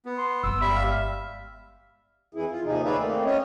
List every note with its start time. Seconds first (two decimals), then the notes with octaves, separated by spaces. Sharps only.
0.05 B3
0.18 C6
0.44 G1 G#3 E6
0.61 G3 E5 B5
0.76 F5
2.35 F2 E3 E4 G#4
2.50 F4
2.65 D#2 C3 F3 D#4 G#4
2.85 G#4 B4 C#5 D5 E5 F5
2.97 A3 A#3 C4
3.25 C#4 C#5 D#5